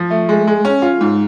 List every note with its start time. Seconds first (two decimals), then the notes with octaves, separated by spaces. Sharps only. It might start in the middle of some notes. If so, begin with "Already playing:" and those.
Already playing: F3
0.10 A3
0.29 G#3
0.47 G#3
0.65 C#4
0.82 F4
1.01 G#2